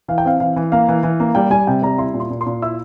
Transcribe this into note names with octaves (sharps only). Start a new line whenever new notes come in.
E3 F5
G5
C4 F5
E3 F5
E3
A#3 F5
E3
E3
A#3
G3 G5
G3 G#5
C3 G5
G3 A#5
E4 C6
A#2
C6
A#2
C6
A#2
E4 E6